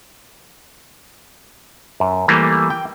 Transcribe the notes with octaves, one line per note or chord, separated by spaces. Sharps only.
F#2
E3 G3 A3 A#3
G5